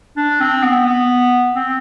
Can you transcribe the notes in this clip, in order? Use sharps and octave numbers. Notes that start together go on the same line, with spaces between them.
D4
C4
B3
B3
C4